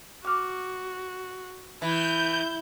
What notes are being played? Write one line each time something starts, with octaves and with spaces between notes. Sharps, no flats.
F#4 D6 F6
E3 E4 G6